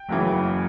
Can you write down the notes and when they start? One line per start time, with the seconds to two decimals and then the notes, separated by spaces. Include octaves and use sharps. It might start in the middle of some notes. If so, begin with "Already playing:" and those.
Already playing: G5
0.09 F#1 F#2 C#3 E3